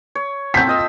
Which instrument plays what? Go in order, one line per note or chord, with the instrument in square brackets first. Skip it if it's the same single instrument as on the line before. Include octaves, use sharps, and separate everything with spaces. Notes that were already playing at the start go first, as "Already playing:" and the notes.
[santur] C#5
[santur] C4 A4 C5 [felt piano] G6 B6
[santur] F4 D#5 E6